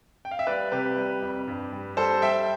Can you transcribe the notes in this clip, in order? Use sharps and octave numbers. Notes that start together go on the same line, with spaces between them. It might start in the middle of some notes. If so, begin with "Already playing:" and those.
G5
F5
E5
G3 B4 D5
C3 G4 B4
G3
F2
G2
G3
G3 A4 C5
G3 E5 G5